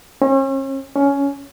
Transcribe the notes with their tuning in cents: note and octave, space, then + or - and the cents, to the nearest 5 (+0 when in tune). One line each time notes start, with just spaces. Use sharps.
C#4 -40
C#4 +15